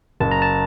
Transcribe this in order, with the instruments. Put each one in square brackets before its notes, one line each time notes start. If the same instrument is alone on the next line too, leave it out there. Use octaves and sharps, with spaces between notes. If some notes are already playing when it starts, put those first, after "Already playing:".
[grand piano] F#1 [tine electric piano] A5
[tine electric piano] A#5
A5